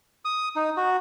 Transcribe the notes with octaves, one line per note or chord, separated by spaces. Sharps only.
D#6
D#4
F#4